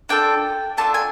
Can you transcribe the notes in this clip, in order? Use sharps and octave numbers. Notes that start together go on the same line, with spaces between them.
D4 F4 A4 G5
A3 D4 F4 A4 A5
G#5